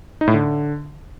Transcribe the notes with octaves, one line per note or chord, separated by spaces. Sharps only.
D#4
A2
D3